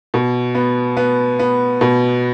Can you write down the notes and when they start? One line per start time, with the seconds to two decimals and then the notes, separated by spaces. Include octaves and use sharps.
0.14 B2
0.55 B3
0.97 B3
1.39 B3
1.81 B2